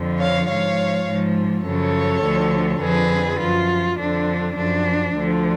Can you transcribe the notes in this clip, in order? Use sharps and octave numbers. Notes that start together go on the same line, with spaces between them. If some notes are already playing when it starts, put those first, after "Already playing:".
Already playing: F2 D3 F3
C#5 F5
G#2 F3 C#5 F5
G#2 F3
F#2 C#3 F3 A4 C#5
D2 D3 F3
F2 D3 F3 G#4 B4
F#2 F3 F4
F2 D3 F3 D4
F#2 F3 D4
D2 D3 F3